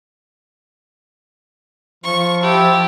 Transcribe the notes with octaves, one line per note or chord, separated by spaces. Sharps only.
F3 C#6
E4 G4 A4